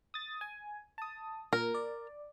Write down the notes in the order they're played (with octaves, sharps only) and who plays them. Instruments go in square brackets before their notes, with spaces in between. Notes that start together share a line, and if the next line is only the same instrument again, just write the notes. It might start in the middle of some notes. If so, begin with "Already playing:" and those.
[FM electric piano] D#6 A6
G#5
A5 D#6
[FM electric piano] A#2 [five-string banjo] A#4
[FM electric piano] D5